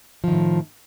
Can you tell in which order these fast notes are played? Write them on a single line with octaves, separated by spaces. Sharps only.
F3 D#3 A2